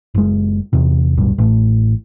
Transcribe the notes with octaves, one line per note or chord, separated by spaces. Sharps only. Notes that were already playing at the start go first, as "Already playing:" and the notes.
F#1 G#3
E2 C3
D1 B1 G2
A1 A2